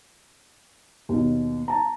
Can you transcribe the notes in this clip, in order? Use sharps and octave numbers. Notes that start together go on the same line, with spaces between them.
D#2 B2
A5 A#5